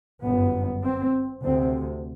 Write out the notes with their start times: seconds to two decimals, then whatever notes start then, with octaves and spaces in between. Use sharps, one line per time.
0.24 G1 F#2 B3
0.83 C4
1.43 D2 C3 C4